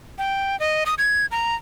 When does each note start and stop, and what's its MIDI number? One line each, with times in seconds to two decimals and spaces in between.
0.18 0.59 79
0.60 0.84 75
0.86 0.94 87
0.98 1.26 92
1.31 1.55 82